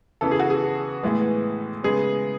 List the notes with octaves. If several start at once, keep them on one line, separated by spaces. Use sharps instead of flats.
C#3 E3 B3 A4
G#4
F#4
G#4
A2 E3 G#3 B3
C#3 G#3 B3 G#4